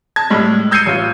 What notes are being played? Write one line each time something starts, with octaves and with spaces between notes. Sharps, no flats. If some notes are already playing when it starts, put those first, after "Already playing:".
A5 G#6
A2 G3 G#3
E6 G6 G#6 C7 C#7 D#7
A1 F4